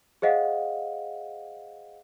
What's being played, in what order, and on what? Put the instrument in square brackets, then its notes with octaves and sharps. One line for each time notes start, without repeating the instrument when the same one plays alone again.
[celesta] G#4 C5 D#5 F5 F#5